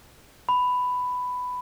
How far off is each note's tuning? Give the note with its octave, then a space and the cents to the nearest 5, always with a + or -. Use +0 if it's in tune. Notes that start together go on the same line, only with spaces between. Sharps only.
B5 +10